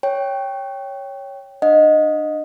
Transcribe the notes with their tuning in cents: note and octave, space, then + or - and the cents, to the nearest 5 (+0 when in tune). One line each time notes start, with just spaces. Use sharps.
C#5 +0 G5 +0
D4 +25 D#5 +0 F#5 -40